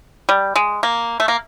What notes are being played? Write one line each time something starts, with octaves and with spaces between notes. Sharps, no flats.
G3
G#3
A#3
A3
A#3